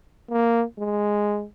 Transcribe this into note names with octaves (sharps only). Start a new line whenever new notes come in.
A#3
G#3